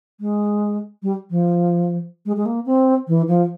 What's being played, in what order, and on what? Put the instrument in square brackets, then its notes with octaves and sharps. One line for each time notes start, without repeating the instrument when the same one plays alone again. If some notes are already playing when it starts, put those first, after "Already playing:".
[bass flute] G#3
G3
F3
G#3
G#3
A#3
C4
E3
F3